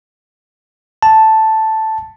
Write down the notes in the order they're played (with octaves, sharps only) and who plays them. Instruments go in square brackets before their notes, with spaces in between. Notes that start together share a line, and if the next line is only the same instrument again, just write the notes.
[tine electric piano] A5